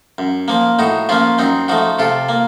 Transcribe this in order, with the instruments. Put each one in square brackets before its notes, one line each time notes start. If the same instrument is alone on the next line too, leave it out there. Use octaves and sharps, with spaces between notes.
[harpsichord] F#2
F3 A#3
A2 D#4 F#4
F3 A#3 C#4 F4
F#2 C4 D#4
F3 A3 D#4 F#4
C3 F4 A4
A#3